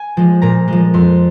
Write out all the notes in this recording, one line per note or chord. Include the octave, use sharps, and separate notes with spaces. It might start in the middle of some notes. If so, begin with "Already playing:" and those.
Already playing: G#5
F3 G#3
A#2 A#5
F3 G#3
F2 C6